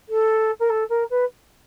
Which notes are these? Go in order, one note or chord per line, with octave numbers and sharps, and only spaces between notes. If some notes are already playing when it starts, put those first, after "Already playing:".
A4
A#4
A4
A#4
B4